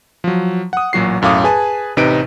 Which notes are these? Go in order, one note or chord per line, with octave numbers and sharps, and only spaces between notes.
F3 F#3
F#5 D#6
A1 A#2 F#3 F#4 C7
B1 F#2 A2 F5 D6 D#6
G#4 B4 G#5 A5
A1 C3 D#4 B4 D7